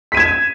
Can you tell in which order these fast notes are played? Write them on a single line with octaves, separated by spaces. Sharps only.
B6 D#7 G#6 E7